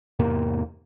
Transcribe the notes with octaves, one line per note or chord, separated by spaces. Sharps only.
E2 G#2 C3 A#3